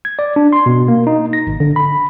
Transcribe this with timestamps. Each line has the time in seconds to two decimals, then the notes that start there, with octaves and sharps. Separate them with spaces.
0.05 G#6
0.19 D5
0.36 D4
0.53 C6
0.66 B2
0.88 A#3
1.07 D#4
1.33 A#6
1.47 G#1
1.60 D3
1.76 B5